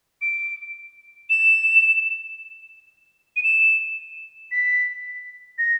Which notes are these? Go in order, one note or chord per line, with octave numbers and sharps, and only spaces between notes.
D7
E7
D#7
E7
B6
A#6